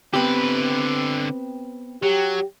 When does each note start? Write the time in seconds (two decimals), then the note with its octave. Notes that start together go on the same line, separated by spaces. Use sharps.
0.14 D3 B3 C4 G4 B4
2.03 F#3 G4